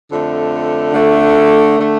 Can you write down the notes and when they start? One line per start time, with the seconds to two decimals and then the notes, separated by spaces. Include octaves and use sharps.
0.09 F2 D3 A3
0.93 F2 D3 A3
1.79 D3 A3